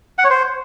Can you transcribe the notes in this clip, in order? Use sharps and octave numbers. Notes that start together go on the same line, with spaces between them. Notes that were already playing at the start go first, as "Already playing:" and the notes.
F#5
C#5
C5